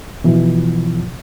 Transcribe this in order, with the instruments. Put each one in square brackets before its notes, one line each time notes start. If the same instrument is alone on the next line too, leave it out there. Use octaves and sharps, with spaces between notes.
[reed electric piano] B2 E3 F3